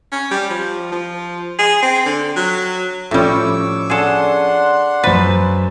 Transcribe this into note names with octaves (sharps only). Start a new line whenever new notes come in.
C#4
G3
F3
F3
G#4
C4
D3
F#3
A2 F3 G3 C#4 C#6 D6 E6
D4 G#4 A4 F#5 C6
F#2 B4 C5 A6